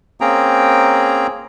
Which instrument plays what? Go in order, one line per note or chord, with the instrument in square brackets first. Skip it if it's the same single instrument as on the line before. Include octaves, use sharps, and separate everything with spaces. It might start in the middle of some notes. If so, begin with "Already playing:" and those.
[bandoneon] A#3 C4 C#4 G#4 G5 A#5